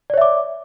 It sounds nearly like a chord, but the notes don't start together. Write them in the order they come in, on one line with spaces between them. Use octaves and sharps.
D5 C#5 E5 D6